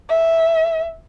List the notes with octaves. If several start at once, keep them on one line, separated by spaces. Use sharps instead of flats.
E5